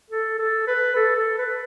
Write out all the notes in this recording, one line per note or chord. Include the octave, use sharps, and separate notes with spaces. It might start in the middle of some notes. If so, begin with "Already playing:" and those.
A4
A4
B4
A4
A4
B4